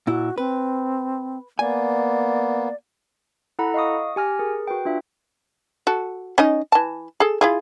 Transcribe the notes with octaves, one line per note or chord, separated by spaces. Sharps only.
A#2 E4 F#4
C4 B4
A#3 B3 D5 G#5
E4 A4 F#5 A#5 B5
D#5 F5 C#6 D#6
G4 G#5 F6 A#6
G#4 A#4
F#4 B4 G5
D4 F4 E5
F#4 A4
C#4 D#4 D#5
E3 A5
G#4 A4
E4 F4 G#4